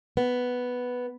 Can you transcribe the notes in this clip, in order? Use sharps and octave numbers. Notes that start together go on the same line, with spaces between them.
B3